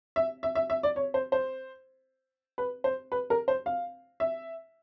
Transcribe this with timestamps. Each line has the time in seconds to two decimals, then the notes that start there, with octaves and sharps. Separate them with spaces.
0.16 E5
0.43 E5
0.55 E5
0.70 E5
0.83 D5
0.96 C#5
1.14 C5
1.32 C5
2.58 B4
2.84 C5
3.12 B4
3.30 A#4
3.48 C5
3.66 F5
4.20 E5